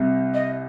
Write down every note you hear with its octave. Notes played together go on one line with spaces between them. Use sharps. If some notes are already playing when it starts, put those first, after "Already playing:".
Already playing: C2 C3
D#5